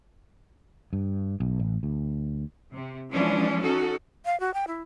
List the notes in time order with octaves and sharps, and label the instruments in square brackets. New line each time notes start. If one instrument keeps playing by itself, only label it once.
[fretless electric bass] G2
B1
A1
D2
[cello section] C3
E3 F3 G#3 C#4 D4
C#4 D#4 F#4 A4
[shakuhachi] F5
F#4
G5
E4